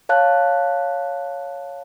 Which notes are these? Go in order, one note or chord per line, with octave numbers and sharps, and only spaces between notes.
C#5 F5 A5 F#6